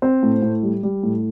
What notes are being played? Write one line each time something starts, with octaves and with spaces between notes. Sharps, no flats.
C4 C5
A2
A2
G3
G3
A2